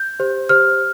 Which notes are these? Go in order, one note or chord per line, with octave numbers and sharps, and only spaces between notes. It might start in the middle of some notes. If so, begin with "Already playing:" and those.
Already playing: G6
G4 C5
G4 C5 F6